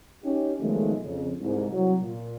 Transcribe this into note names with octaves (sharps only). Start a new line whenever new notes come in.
C#4 D#4 G4
B1 D#3 F3 G#3 A3
F2 C#3
C2 G#2
C2 F#3
A#2